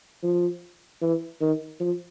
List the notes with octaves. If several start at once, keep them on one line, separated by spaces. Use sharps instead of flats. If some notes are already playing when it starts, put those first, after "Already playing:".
F3
E3
D#3
F3